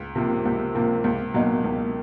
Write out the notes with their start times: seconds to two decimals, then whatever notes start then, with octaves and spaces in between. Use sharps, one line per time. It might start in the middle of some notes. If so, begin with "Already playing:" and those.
Already playing: C#2
0.15 C3 F3 A#3
0.46 C#2
0.75 C3 F3 A#3
1.04 C#2
1.34 B2 F#3 A#3 D#4
1.64 C#2